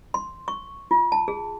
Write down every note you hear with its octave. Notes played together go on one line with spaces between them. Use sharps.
C6
C#6
F4
A5
G#4